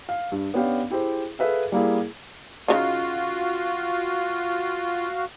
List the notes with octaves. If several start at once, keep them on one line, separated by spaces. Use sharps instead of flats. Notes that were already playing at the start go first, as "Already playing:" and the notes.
F5
G2
B3 C#4 D4 G4 F5
E4 G4 G#4 C5
G#4 A4 B4 E5 F5
G3 A#3 E4 G#4
C#3 D#4 F4 F#4 F5